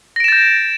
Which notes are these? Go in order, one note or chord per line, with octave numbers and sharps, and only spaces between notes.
G6 A6 A#6 D7 E7